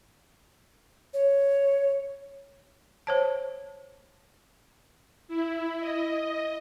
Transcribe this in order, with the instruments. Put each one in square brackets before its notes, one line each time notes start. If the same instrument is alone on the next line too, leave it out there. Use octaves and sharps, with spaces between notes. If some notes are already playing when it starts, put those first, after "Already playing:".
[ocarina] C#5
[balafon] C5 C#5 A5
[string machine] E4
D#5